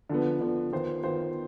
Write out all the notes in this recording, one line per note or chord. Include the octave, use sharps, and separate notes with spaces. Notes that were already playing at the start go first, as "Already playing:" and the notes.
D3 F3 B3
D3 F3 B3
D#3 B3 F4 C5
D#3 B3 F4 C5